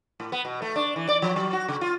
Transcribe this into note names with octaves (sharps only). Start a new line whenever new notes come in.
A2
B3
B2
A3
D4
E3
D5
F3
F#3
F#4
C#3
F4